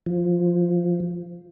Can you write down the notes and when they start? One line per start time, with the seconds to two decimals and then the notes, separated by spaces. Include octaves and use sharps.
0.06 F3